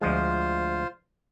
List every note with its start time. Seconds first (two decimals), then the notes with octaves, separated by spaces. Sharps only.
0.01 D2 F3 G#3 F4 C5